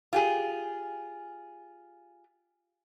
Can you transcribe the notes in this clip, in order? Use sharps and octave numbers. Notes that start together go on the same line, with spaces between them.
F4 G4 G#4